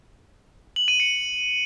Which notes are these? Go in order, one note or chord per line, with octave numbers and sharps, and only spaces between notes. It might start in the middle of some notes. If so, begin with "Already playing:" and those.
F#7
D#7
C#7